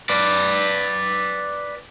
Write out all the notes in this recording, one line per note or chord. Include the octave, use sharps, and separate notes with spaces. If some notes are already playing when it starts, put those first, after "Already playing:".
B4 D5